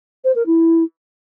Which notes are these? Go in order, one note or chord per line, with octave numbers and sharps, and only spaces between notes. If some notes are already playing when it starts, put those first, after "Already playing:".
C5
A#4
E4